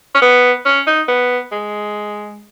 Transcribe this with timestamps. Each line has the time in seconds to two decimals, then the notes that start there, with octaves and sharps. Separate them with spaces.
0.14 C#4
0.21 B3
0.65 C#4
0.87 D#4
1.08 B3
1.52 G#3